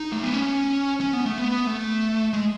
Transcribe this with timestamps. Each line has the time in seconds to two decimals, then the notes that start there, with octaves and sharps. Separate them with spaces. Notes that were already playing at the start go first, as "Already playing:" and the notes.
Already playing: D#4
0.12 A3
0.23 B3
0.33 C#4
1.00 C#4
1.13 B3
1.26 A3
1.38 B3
1.67 A3
2.33 G#3